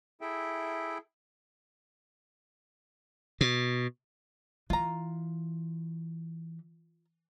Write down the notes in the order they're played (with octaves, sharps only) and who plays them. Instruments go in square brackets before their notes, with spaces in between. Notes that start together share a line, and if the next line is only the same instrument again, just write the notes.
[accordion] E4 G#4 A4 E5 G5
[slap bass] B2
[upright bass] E3 [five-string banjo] F4 A#5